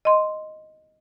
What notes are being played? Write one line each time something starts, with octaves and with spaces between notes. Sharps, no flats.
D#5 C6